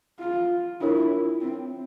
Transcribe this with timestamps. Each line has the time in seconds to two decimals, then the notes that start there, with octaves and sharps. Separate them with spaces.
0.19 F4
0.81 D4 E4 F4 A#4 C#5
1.41 C4